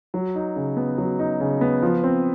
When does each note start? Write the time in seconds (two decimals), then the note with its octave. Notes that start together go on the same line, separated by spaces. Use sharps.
0.14 F#3
0.35 D#4
0.56 C#3
0.77 B3
0.98 F#3
1.19 D#4
1.40 C#3
1.61 B3
1.82 F3
2.03 C4